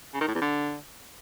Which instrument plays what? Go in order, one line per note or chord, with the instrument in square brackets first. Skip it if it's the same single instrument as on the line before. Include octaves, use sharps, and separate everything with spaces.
[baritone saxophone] C#3
D#3
A2
E2
D3